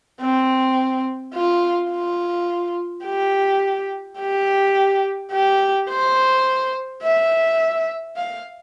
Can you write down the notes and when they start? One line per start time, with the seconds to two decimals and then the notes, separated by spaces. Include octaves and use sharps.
0.21 C4
1.34 F4
1.91 F4
3.05 G4
4.19 G4
5.32 G4
5.89 C5
7.03 E5
8.16 F5